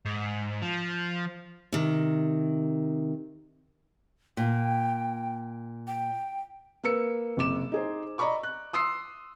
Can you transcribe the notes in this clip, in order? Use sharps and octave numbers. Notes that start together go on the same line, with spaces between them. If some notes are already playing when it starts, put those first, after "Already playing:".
G#2
F3
C3 D#3
A#2 G5
G5
A#3 B4 E6 C#7
F#1 C3 D6 E7
D#4 G#4 C5
D5 D#5 A#5 B5 C#6 D6
F#6
C6 D#6 E6 C7